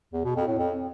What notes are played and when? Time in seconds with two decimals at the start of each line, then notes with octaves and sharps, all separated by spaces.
0.13 E2
0.24 B2
0.36 F2
0.47 A2
0.58 F2